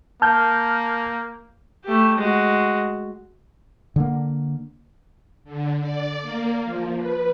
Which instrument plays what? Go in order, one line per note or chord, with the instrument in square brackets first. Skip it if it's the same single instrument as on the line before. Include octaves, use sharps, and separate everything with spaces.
[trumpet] A#3 [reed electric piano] A5 [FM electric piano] F6 G6
[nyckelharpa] A3 G4
G#3 F#4
[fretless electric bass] D3 A#3
[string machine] D3
D5
A#3
F3
B4